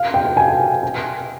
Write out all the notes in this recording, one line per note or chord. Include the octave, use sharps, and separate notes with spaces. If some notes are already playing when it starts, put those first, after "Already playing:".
Already playing: F5
G5
G#5
G#5